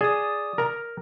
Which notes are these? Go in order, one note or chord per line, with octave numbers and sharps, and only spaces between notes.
G#4 D5 D#6
A#4 A#5